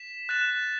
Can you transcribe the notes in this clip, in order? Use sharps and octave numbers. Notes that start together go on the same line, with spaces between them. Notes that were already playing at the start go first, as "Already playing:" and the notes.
Already playing: B6 E7
F#6 A6 E7